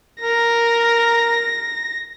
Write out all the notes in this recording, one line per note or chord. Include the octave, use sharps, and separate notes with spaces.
A#4 A#6